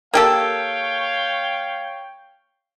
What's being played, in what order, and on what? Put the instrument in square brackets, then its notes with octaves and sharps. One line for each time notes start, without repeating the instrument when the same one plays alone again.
[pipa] A#3 G4 A4 [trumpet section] C#5 F5 G5